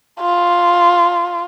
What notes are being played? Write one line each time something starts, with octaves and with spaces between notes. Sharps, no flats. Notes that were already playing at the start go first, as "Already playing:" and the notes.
F4